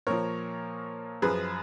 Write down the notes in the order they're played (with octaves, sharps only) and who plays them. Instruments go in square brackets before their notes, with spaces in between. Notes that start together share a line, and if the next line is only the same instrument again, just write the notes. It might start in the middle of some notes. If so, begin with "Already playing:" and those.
[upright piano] A#2 F3 A#4 C#5
F#2 F3 G#4 B4